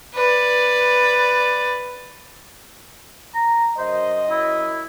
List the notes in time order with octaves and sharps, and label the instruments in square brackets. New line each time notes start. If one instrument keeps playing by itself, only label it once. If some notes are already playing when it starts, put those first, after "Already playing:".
[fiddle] B4 D5
[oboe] A#5
[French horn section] F#2 D#5 [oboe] C5
[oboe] E4